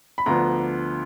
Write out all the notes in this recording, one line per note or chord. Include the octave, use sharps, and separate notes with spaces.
B5
D2 D3 F3 B3 A#5